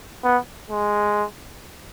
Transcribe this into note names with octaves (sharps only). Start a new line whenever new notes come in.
B3
G#3